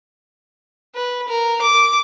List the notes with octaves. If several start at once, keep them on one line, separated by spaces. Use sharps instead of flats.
B4
A#4
D6